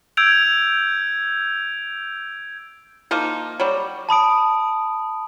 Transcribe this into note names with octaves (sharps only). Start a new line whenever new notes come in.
E6 G6 G#6 D7 F7
F3 A#3 D#4
F#3 G3
A5 B5 D#6 D7